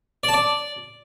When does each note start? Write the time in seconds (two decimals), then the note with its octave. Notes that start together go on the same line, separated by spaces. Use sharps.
0.23 D5
0.28 A5
0.33 D5